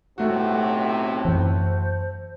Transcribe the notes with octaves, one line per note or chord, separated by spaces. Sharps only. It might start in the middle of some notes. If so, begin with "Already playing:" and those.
B1 A2 C3 A3 F#4 F#5
F#2 E3 C5